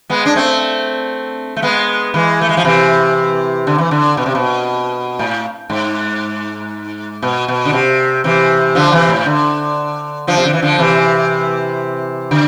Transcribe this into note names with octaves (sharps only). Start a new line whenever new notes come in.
G#3 B3
D4
A3 C4
A3
G#3 B3
E3 G#3
A3
G#3
F3
C3 E3
D3
E3
D3
B2
C3
B2
A2
G#2
B2
B2
D3
C3
C3 E3
D3 F3
C3 E3
A2
D3
D3 F3
C3
D3
E3
D3 F3
C3 E3
D3